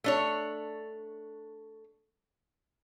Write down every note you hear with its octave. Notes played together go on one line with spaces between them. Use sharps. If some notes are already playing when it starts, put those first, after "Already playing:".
A3 D4 C#5